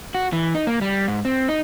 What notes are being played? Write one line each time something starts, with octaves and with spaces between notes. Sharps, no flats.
F#4
E3
D#4
A#3
G3
G#2
C4
D#4